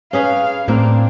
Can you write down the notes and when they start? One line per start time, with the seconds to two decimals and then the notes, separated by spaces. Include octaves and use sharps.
0.13 C#4 G#4 B4 F5
0.68 A2 A#3 C4 D4